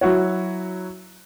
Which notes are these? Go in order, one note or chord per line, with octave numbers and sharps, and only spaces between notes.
F#3 E4 F#4 C#5